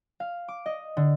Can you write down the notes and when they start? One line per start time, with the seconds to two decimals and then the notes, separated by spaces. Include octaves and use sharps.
0.20 F5
0.48 D6
0.66 D#5
0.97 D3